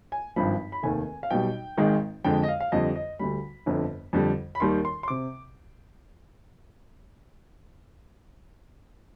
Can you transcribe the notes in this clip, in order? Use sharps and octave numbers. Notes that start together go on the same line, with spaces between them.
G#5
G#1 G2 F3 B5
B5
F1 D#2 D#3 G#5
F5
B1 B2 G3 G5
G#1 G#2 D#3 G#3
F2 D3 G#3 G5
D#5
F5
F5
F2 D3 G3 D#5
D#5
D2 D3 G3 B5
G1 F2 D3
F2 D3 G3
B5
D#2 D#3 G3 C6
C6
C6
C3 D6